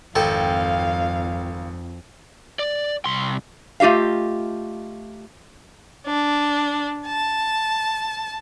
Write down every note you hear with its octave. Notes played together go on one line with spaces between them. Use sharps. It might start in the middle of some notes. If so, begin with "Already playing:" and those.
G#1 F2 A4 F5 G5
D5
C2 C6
A3 F4 G4 D#5 F5
D4
A5